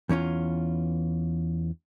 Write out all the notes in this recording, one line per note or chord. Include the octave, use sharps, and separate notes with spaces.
E2 E3 C#4 F4